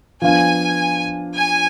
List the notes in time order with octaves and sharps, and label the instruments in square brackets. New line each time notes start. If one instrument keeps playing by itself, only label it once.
[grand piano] F3 B3 D4 F4 [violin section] G#5
[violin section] G#5